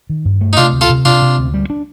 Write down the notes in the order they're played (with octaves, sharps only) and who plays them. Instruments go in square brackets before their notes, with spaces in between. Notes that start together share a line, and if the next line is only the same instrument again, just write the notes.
[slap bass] D#3
G2
A3
[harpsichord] D#4
[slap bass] C3 [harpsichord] D4 F4
[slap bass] D2
[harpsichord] F4 A4
[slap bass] C3
[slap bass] C3 [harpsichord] D4 F4
[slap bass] C3
D2
G3
D4